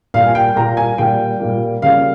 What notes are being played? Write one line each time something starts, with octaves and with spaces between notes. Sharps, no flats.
A#2 G3 A#3 F5
G#5
G5
A#2 G3 A#3 A#5
G#5
A#2 G3 A#3 G5
A#2 G3 A#3
C#3 G3 A#3 F5